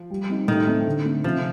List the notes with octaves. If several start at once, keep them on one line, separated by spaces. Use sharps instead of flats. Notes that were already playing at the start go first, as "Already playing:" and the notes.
Already playing: F3
G3
C4 D#4
A2 D#3
A3 C4 D#4
D3
A3 C4
C3 F3